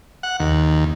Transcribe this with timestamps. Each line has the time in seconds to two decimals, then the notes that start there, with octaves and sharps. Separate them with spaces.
0.23 F#5
0.40 D#2